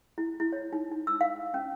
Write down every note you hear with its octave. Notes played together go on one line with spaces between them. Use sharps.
E4
E4
C#5
D#4
D#4
E6
F5
C#4